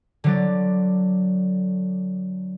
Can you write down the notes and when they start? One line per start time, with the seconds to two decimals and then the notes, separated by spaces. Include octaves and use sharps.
0.24 D3 F#3 D5